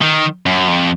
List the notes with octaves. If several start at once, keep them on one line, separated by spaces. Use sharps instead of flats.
D#3
F#2
F2